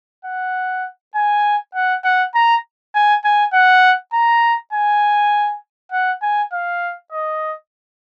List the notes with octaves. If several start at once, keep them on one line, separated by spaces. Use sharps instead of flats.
F#5
G#5
F#5
F#5
A#5
G#5
G#5
F#5
A#5
G#5
F#5
G#5
F5
D#5